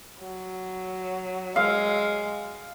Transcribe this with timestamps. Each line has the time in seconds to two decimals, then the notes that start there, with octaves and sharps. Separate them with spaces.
0.19 F#3
1.56 G#3 F5